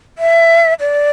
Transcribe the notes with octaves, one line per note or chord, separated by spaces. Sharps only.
E5
D5